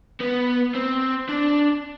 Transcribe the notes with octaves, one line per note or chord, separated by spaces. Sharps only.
B3
C4
D4